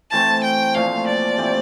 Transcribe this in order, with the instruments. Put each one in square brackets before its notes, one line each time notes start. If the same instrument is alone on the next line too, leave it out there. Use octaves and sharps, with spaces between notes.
[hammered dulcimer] E3 A3 C4 [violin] A5
[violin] G5
[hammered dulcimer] A#2 F3 A3 [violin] F5
[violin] D5
[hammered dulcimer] C3 E3 A3 C4